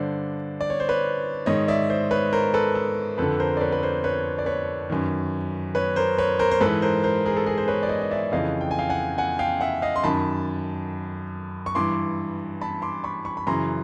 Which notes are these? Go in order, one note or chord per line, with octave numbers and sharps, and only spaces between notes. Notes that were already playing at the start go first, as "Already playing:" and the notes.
Already playing: G2 D3 C5 D5
D5
C#5
C5
B4 C#5
G#2 D#3 C#5 D#5
D5 E5
C5 D5
B4 C#5
A#4 C5
A4 B4
A4
F2 D3 A4 B4
A#4 C5
D5
B4 C#5
B4
A#4 C5
B4 C#5
D5
B4 C#5
F#2 D#3
B4 C#5
A#4 C5
B4 C#5
A#4 C5
C5
G#2 E3 A4 B4
A#4 C5
A#4 C5
G#4 A#4
A4
G#4 A#4
C5
B4 C#5
D5
C#5 D#5
D#5
D5 E5
F2 C#3 E3 D#5 F5
G5
G#5
F5 G5
F#5 G#5
F#5 G#5
F5 G5
E5 F#5
D#5 F5
C6
F#2 D#3 A5 B5
C#6
G2 E3 C6 D6
A5 B5
C6 D6
B5 C#6
B5 C#6
B5
F#2 C#3 E3 A#5 C6